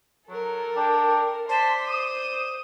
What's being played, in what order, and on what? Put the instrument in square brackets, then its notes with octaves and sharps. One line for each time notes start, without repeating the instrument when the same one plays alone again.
[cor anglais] F#3 [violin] A4 A#4
[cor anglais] D4 [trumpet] G5
[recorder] C5 [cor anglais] D5 [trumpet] A5 [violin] C6 B6
[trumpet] D#6 [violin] D#7